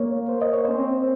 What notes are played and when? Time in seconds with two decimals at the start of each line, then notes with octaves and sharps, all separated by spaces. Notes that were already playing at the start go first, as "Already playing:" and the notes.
Already playing: A#3 C#5
0.29 C5
0.42 D#5
0.53 C#5
0.65 C#4 C5
0.77 C4